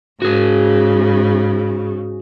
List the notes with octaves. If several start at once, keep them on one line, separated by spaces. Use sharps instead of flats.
G#2 C#3 F#4 G#4